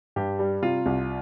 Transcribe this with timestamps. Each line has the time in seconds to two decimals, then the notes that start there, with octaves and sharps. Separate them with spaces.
0.16 G2 G4
0.39 G3
0.62 C3 F4
0.86 C2